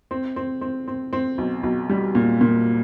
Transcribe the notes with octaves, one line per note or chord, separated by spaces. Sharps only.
C4
C4
C4
C4
C4
B1
B1
G3
A#2
A#2